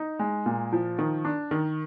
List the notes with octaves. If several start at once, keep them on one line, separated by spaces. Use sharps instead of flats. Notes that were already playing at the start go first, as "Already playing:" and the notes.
Already playing: D#4
G#3
A#2
F3
D#3
D4
D#3